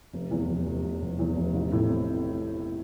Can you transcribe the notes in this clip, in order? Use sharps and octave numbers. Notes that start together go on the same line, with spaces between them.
F1
E2
F1
F1
F1
F1
E2
F1
A1
A2
C4